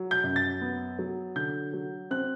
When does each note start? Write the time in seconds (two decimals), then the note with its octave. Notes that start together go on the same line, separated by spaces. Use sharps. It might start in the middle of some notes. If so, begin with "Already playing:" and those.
Already playing: F#3
0.11 G6
0.24 F#2
0.36 A6
0.61 B3
0.99 F#3
1.36 D3 G6
1.73 F#3
2.11 C4 F#6